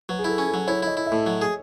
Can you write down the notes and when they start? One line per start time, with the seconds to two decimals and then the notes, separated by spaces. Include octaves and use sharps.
0.09 F#3 B4
0.19 G#4
0.24 E4 A4
0.38 C#4
0.48 A4
0.54 F#3
0.68 E4 C#5
0.82 E4 D#5
0.97 E4
1.07 E5
1.12 A2
1.26 F#3
1.41 G#4